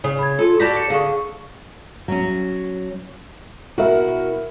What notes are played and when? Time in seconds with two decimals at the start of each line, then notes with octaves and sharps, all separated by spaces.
0.04 C#3
0.19 B5 G#6
0.39 F4 A4
0.60 F#4 G4 D5 A5 G6 A#6 B6
0.76 C#7
0.90 D3 G#4 F5 C#6
2.08 F#3 C#4
3.78 B2 E4 F#4 A#4 E5